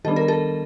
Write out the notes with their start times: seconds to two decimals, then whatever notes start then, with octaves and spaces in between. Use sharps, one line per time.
0.05 D#3 G3 B3 D4 A4
0.16 A#4
0.28 A4